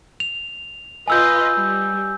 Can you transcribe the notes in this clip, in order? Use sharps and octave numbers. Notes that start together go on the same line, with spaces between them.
F7
F4 B4 D#5 G#5 E6 G6
G3